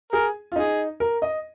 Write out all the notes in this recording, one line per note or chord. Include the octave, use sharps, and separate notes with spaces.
G#4 A#4
F4
D#4 G#4
A#4
D#5